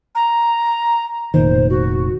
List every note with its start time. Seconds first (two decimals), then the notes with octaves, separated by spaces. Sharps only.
0.15 A#5
1.34 F1 A#2 D#3 C5
1.70 F#4